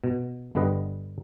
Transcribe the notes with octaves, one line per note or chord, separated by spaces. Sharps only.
B2
G1 D3 G3 B4 D#5